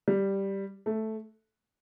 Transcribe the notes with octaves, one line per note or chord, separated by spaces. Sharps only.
G3
A3